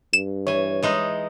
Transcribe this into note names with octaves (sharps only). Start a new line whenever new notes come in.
G2 E7
E3 C#5 G#5
E3 G#3 D#4